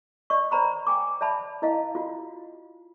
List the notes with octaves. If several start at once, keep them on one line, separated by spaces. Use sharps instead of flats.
D5 D#5 C#6
C5 D5 A#5 B5 C#6
G5 G#5 D6
D5 E5 A5 B5
E4 D#5 F5
F4 F#4